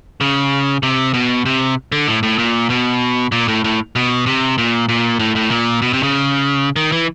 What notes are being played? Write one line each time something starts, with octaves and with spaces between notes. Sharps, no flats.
C#3
C3
B2
C3
D3
A2
A2
A#2
B2
A#2
A2
A2
B2
C3
A#2
A#2
A2
A2
A#2
B2
C3
C#3
D#3
E3